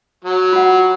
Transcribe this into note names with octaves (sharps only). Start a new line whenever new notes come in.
F#3
F4 F#5